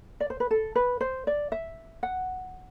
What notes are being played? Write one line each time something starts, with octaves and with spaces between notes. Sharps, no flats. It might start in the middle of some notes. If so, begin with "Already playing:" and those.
D5
C5
B4
A4
B4
C5
D5
E5
F#5